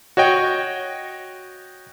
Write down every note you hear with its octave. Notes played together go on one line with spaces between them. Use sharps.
F#4 C#5 D#5 G5